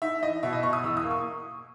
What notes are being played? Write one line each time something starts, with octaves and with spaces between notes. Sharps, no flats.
D#4 E5
E3 D#5
B2 E5
D#5
B2 C#6
D#6
E2 E6
D#6
A#3
C#6